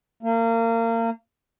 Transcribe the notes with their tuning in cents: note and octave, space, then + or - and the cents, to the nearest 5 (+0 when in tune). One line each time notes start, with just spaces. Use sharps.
A#3 -30